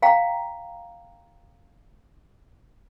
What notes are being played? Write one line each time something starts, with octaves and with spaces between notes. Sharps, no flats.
F5 G5 A#5